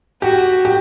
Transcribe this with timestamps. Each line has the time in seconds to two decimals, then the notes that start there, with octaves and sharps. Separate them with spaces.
0.22 F#4 G4
0.65 G4